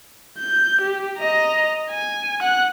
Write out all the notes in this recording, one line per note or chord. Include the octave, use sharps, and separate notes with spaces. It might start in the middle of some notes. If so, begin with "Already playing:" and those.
G6
G4
D#5 A#5
G#5
F#5 F#6